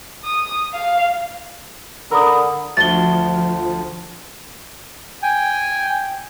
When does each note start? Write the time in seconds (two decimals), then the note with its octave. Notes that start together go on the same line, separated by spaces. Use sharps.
0.24 D#6
0.74 F5
2.11 D3 A#4 B5 D#6 E6
2.77 D2 F3 A6 G7
5.23 G5 G#5